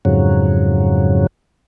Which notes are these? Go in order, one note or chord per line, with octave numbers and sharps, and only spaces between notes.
F2 G#2 C#3 F#3